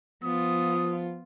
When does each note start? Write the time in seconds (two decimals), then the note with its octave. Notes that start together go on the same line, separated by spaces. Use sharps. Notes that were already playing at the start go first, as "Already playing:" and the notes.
0.23 F3 B3 F4 D#6